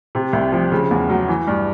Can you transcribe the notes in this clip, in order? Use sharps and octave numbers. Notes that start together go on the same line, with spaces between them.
C3
C2
F3
C#3
E2
F#3
E3
G2